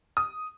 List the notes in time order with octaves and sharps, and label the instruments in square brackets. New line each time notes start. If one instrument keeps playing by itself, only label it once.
[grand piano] D#6